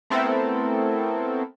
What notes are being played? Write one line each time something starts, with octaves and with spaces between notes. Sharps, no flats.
A3 B3 C4 E4 A4 A#4